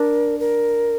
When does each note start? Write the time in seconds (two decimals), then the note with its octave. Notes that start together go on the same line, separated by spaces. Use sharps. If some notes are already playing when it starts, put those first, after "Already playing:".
Already playing: D4 A#4
0.40 A#4